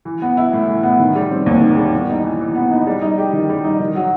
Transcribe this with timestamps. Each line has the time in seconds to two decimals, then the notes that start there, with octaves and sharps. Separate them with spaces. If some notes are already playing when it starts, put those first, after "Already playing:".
0.05 E3
0.22 B3
0.37 E4
0.53 A2
0.68 E3
0.83 B3
0.99 D#3
1.15 G3
1.31 C4
1.46 D#2
1.61 D#3
1.77 G3
1.92 B3
2.09 D#4
2.24 E3
2.39 E3
2.55 B3
2.71 D#4
2.87 G3
3.02 D#4
3.18 G4
3.33 D#3
3.49 G3
3.64 D#4
3.80 D#3
3.95 F#3